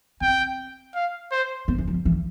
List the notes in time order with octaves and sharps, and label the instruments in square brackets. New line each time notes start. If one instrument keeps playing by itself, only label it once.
[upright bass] C4 [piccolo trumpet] G5
[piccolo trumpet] F5
C5
[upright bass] B3
E3
F3
E3